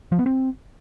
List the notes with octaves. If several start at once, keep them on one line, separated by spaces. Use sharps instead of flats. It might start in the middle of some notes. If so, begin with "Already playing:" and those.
F3
B3
C4